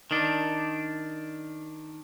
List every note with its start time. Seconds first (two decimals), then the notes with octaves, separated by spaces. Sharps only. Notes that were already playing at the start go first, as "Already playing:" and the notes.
0.11 D#3 D4